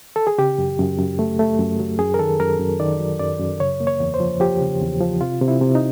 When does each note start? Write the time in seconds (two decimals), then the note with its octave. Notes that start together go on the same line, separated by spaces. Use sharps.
0.16 A4
0.27 G#4
0.38 C#3 G4
0.58 F#2
0.78 F#2
0.99 F#2
1.19 A3
1.39 A3
1.59 F#2
1.79 F#3
1.99 F#2 G#4
2.14 A#4
2.19 D#3 A4
2.40 F#2 A#4
2.60 F#2
2.80 D#3 D5
2.99 F#3
3.19 F#2 D5
3.40 F#2
3.60 C#3 C#5
3.80 A#3
3.87 C#5
4.00 E2
4.14 C5
4.20 F3
4.40 F3 G4
4.61 C#3
4.81 E2
5.01 F3
5.21 C3 F4
5.41 C3
5.48 E4
5.61 C3
5.75 D#4